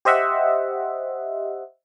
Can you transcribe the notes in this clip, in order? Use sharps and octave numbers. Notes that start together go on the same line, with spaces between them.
G4 C5 D#5 E5 F#5